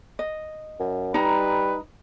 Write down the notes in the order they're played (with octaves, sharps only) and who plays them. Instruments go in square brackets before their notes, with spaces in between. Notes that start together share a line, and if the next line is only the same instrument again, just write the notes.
[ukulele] D#5
[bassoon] F#2
[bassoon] G3 [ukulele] D#4 A#5 [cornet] B4